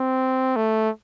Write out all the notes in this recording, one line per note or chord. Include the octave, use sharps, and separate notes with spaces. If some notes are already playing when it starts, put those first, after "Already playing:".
Already playing: C4
A3